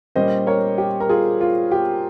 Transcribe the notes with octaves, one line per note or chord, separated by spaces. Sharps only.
A#2 G3 C#4 C5 D#5
A#4 C#5
G4
A#4
F4 G#4
F4
G4